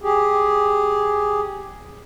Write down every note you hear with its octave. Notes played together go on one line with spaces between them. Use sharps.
G4 G#4